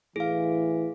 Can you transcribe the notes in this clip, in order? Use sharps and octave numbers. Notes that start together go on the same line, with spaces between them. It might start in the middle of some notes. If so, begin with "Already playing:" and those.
A2 E3 G#4 F5